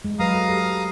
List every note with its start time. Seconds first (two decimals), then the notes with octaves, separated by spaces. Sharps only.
0.05 G#3
0.19 F#3 B4 F5 A#5 D#6
0.34 A4
0.48 G4 A4